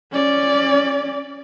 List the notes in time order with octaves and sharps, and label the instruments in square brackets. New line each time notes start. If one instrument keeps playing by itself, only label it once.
[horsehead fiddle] C#4 D5